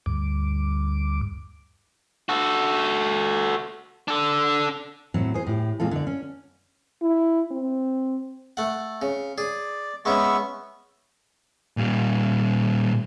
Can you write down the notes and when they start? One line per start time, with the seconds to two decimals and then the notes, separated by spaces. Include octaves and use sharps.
0.06 D2 G2 D6
2.29 F#4 A4
4.08 D4 A4
5.14 A2 F#3 C4
5.34 G#4 C5
5.47 A2 G4
5.80 A#2 G#3 C4 F4 A4
5.91 D3 D5
6.07 C#4
7.02 E4
7.51 C4
8.57 A3 F#5
9.02 C#3
9.38 G#4 D5
10.05 G#3 B3 C#4 E5 C#6
11.77 A#2 G3